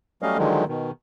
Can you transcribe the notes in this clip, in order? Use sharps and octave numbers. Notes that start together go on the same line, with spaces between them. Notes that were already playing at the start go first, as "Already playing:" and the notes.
F#3 G3 A3 C#4 D#5 F5
D3 D#3 F3 F#3 G#3
B2 D#3